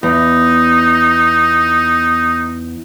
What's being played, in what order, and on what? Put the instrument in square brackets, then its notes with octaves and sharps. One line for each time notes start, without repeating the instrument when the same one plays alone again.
[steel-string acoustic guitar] E2 [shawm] D#4